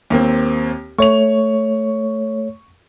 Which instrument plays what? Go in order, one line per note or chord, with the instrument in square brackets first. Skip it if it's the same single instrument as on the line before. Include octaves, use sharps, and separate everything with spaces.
[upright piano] D#2 A#3 C4
[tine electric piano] A3 C#5 [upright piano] C#6 F7